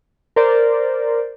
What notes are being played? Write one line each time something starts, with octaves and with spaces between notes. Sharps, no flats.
A#4 C5 D5